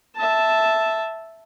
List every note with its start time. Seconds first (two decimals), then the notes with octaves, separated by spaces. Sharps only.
0.16 E5 A5